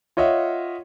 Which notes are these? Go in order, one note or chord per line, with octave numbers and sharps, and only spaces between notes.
F4 C#5 D#5 E5 F#5